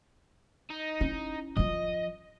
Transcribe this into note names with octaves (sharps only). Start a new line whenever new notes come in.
D#4
C#4 E4
F3 F4 D#5